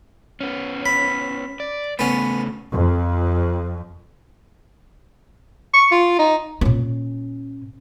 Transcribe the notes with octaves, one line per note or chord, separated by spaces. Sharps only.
B3 C#4
B5
D5
C#3 A3 B3 C#4
F2
C#6
F4
D#4
A#2 C#4